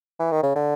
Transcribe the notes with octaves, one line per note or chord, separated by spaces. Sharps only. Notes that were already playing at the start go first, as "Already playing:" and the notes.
E3
D#3
C#3
D3